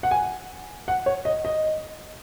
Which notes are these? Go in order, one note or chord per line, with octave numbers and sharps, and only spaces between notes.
F#5
G#5
F#5
C#5
D#5
D#5